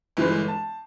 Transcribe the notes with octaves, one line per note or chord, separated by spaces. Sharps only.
G1 E3 G#3 B4
A5